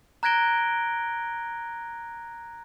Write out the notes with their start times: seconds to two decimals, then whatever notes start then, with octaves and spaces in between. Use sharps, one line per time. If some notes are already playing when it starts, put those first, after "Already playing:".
0.23 A#5 F#6 G#6 A#6 D7 G7